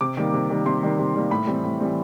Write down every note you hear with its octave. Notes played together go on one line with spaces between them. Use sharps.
C3 D6
D#3 G3 A#3
C3
D#3 G3 A#3
C3 C6
D#3 G3 A#3
C3
D#3 G3 A#3
A2 B5
E3 G3 C4
A2
E3 G3 C4